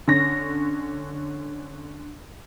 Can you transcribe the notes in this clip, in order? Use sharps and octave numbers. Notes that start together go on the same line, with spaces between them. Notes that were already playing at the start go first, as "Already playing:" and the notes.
D3 C#4 A#6